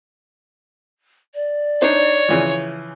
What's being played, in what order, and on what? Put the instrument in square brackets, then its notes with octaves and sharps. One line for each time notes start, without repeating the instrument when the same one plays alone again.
[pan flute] D5
[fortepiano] D4 D#4 C5 [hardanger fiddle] C#5
[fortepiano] C#3 E3 F3